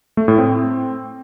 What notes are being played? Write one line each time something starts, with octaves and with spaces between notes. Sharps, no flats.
A3
A2
C4